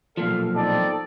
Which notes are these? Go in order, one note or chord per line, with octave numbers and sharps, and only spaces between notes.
B1 A#2 F3 A4 D5 F5
C4 D#4 A4 D5